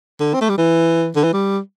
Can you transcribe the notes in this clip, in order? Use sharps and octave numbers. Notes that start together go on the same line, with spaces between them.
D3
C4
A3
G3
E3
D3
E3
G3